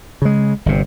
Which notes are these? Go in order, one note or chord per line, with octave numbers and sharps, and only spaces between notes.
C#3 G#3
G1 C3